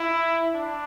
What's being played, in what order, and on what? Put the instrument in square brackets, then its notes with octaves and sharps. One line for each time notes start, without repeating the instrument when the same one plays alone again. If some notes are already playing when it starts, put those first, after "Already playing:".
Already playing: [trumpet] E4
D4